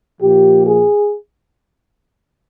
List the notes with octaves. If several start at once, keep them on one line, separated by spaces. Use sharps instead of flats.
A#2 F3 G4
G#4